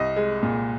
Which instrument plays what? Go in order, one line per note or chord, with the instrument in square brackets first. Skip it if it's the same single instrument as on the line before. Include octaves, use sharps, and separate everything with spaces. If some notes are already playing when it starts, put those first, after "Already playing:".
Already playing: [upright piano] C2 D#5
G#3
A#2